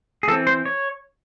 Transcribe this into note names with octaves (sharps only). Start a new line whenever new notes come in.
G#4
E3 C4 A4
C5
C#5